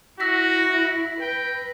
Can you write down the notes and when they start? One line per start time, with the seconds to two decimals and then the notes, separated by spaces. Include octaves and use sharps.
0.20 E4 F#4 E6 A#6 B6
1.21 B4 G5